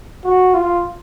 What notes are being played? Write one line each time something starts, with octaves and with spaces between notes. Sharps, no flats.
F#4
F4